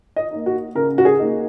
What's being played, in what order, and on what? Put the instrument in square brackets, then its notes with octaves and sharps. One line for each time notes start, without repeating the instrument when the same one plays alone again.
[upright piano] D#5
A#3 D#4
F#4
C#3 A#4
F#4
G#4
A#3 D#4